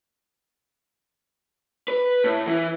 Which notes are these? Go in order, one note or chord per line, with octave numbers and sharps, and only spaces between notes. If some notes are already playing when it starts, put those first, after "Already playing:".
B4
A2
E3